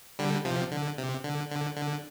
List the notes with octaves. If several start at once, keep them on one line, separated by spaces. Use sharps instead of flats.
D3 G3
C3 F3
D3
C3
D3
D3
D3